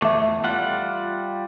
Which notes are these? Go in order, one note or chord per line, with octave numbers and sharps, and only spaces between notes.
E2 A3 E5 D6
G3 F4 F#5